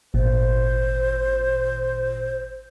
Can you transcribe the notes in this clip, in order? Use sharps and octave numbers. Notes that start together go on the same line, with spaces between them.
G#1 A#2 C5